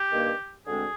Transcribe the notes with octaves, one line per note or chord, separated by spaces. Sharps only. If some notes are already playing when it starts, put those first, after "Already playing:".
Already playing: G4
G2 D#3 A#3
D2 D3 G#3 C4 G#4